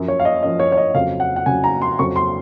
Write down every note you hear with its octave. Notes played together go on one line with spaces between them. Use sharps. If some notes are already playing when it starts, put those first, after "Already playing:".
Already playing: F#2 F3
C#5
F5
D#5
F#2 F3 D#5
C#5
C#5
D#5
F2 C#3 F#3 F5
F#5
F#5
F2 C#3 F#3 G#5
A#5
C6
F2 C#3 F#3 C#6
C6